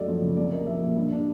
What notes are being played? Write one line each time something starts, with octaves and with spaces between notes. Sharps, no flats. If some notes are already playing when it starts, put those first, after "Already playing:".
Already playing: F#2 F#3 A3 D5 D#5
F3
C#3
C2 D5
A#3 D#5
F3 E5
A#2
G2
D4